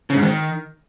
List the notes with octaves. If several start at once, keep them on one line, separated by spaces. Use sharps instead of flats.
C#3
G#2
D#3